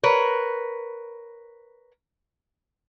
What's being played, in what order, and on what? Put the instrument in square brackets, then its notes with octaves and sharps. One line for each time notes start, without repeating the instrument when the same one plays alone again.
[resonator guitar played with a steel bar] A#4 B4 C#5